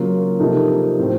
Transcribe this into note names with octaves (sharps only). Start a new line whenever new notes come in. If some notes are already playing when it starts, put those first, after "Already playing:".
Already playing: C#3 F#3 A#3 F4
C3 F3 A#3 D#4 A4
A2 F3 C4